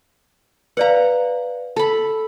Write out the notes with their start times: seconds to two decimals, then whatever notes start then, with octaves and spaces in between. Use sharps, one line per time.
0.77 B4 D5 F5 F#5 A#5
1.76 A4 A5 B5